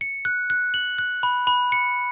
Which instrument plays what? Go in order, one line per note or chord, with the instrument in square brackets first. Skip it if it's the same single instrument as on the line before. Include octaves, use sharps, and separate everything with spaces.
[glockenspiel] C#7
F#6
F#6
F#7
F#6
B5
B5
C#7